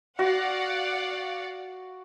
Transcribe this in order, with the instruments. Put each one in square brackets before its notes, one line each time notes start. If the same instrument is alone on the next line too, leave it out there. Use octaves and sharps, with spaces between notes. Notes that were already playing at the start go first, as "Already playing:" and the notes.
[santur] F#4 [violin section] D5 F5 F#5